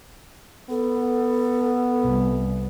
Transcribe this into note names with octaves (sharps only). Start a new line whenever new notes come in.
B3 A4
C2